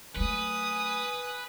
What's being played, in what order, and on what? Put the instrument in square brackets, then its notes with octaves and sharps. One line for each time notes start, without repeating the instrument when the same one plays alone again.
[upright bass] F#3 A3 [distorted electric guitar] B4 [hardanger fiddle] G#5 D#6